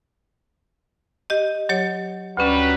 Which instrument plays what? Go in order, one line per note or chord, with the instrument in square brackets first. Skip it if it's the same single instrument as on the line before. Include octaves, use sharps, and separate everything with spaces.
[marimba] G4 D#5
F#3 G4 C#5
[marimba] D2 C#4 [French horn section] F#3 G3 B4